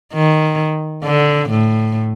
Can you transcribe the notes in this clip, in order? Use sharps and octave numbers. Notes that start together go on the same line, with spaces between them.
D#3
D3
A2